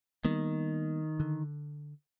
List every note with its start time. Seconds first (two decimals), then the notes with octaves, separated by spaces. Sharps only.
0.25 D#3 G3 A#3 B3
1.20 D3